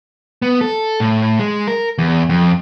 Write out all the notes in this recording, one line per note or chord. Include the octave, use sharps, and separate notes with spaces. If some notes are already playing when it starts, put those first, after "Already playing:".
B3
A4
A2
G#3
A#4
E2
F2